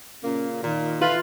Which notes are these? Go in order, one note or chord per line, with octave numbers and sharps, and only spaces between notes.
A#2 C#3 A#3 C#4
A#2 D#3
E3 F4 A4 B4